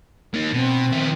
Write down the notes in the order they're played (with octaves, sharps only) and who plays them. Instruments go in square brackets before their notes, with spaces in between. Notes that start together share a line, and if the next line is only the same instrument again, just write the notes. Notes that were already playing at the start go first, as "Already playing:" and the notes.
[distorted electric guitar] A#3 D#4
[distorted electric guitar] B2 [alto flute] C4
[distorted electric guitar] D#3 E4